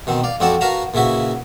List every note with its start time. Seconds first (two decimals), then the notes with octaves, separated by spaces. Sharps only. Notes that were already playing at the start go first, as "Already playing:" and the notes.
0.07 B2 D#3 C4
0.24 D5 F5
0.40 F2 C4 F#4 D5 F#5 A5
0.61 F#4 A#4 B4 F5 A5 A#5
0.94 A#2 C#3 E4 F#4 B4